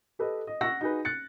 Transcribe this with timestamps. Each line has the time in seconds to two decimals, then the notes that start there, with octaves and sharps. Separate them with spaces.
0.19 G4 A4 B4 D#5
0.47 D#5
0.61 F#5 C#6 E6 A#6
0.81 D#4 F#4 G#4 B4
1.05 F#6 A6 C#7